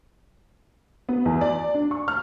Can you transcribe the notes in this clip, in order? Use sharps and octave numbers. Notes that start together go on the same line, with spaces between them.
B3
E2
D5
D4
C#6
F6